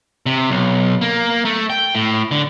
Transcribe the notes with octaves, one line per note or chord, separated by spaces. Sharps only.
C3
B1
A#3
A3
G5
A2
D3